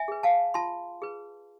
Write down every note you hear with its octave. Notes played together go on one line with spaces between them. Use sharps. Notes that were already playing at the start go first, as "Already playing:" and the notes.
Already playing: E5 G#5
G#4 B4
F5 A5
F4 A5 C6
G#4 B4